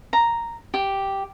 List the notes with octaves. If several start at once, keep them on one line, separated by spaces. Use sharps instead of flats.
A#5
G4